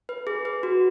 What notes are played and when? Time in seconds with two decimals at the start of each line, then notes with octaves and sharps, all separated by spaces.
0.09 B4
0.27 G#4
0.45 B4
0.63 F#4